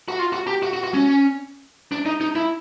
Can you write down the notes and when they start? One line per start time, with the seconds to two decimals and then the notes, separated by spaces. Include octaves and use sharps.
0.08 F#4
0.19 F4
0.33 F#4
0.47 G4
0.63 F#4
0.73 F#4
0.84 F#4
0.94 C#4
1.92 D4
2.06 D#4
2.21 D#4
2.36 E4